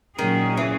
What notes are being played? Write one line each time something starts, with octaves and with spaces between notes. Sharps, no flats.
A#2 D#3 F#3 C#4 G#4
E3